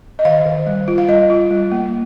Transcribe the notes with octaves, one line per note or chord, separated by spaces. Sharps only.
D#5
D#3 F5
D#3
G3
F4
F5
G3 D#5
F4
G3
A#3